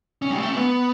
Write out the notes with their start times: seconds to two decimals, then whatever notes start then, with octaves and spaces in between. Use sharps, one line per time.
0.22 C#4
0.30 G3
0.38 A3
0.49 C#4
0.55 B3